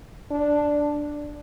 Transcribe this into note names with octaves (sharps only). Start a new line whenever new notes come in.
D4